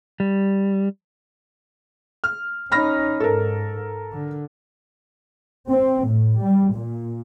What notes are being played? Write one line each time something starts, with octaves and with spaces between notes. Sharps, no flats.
G3
F6
C#4 D#4 B5 F6 A#6
G#2 A4 A#4
D3
C4
A2
G3
A#2